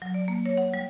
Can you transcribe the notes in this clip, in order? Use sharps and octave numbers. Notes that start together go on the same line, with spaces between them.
F#3
D5
A#3
C#5
F#5
G3